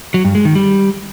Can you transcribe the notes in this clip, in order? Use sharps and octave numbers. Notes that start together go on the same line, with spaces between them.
F#3
G2
G#3
D#3
G3